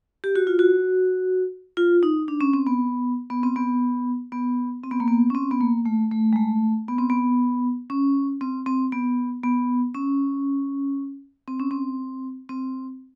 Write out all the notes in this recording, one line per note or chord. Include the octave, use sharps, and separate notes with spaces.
G4
F#4
F4
F#4
F4
D#4
D4
C#4
C4
B3
B3
C4
B3
B3
C4
B3
A#3
B3
C#4
C4
B3
A#3
A3
A3
G#3
A3
B3
C4
B3
C#4
C4
C4
B3
B3
C#4
C4
C#4
C4
C4